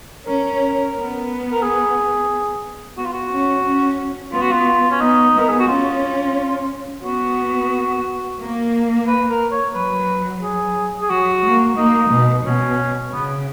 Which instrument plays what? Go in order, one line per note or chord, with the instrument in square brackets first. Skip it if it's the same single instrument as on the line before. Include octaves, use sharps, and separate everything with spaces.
[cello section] C#4 [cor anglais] A#4
[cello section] B3
[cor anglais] A#4
G#4
[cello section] B3 [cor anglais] F#4
[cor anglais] F4
F#4
[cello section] C#4
C#4
[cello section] B3 [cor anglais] F4
[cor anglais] F#4
F4
C#4
[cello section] B3 [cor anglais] D#4
[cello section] B3
[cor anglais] A#4
G#4
F#4
[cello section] C#4 [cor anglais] F4
[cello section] B3 [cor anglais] F#4
[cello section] A#3
[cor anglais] B4
A#4
C#5
[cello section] F#3 [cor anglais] B4
[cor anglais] G#4
G#4
[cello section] F#3 [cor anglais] F#4
[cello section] A#3
[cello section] A#3 [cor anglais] D#4
[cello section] B2
[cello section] B2 [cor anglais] C#4
[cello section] C#3 [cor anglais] B3